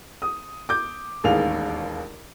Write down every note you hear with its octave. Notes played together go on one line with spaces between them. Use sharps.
D#6
D6 G6
E1 A1 D#2 G#4 F5 F7